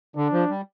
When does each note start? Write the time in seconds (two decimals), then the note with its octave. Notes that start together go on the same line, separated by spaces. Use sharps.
0.16 D3 D4
0.33 F3
0.50 G3